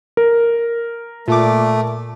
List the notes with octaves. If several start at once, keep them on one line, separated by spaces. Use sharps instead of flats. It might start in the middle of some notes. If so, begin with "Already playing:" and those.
A#4
A#2 A3 D6